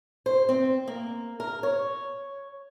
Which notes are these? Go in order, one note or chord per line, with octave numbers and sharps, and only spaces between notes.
C5
C4
A#3
A#4
C#5